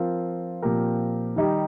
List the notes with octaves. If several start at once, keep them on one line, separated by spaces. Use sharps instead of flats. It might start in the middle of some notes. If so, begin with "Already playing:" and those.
Already playing: F3 C4 F4 A#4
A#2 F3 C4 G4 A#4
D#3 G3 D#4 G4